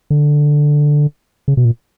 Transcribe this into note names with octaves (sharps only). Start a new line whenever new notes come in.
D3
C#3
B2
A#2